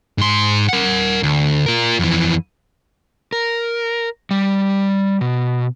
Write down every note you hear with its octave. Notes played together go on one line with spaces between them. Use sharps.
G#2 C6
A#4 F#5
D2
F4 A#4
F2 E3
A#4
G3
B2